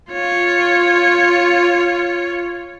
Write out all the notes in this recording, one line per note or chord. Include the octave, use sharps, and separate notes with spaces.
F4 C#5